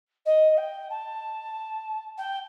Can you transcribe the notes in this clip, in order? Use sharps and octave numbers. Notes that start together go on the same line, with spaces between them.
D#5
G5
A5
G5